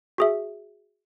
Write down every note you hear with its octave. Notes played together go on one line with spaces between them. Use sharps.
F#4 G#4 E5